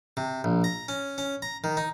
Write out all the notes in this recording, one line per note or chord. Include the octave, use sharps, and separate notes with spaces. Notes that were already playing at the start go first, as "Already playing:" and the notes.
C3
A#1
A#5
C#4
C#4
A#5
D#3
D#4